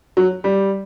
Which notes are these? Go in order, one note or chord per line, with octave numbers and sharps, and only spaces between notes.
F#3
G3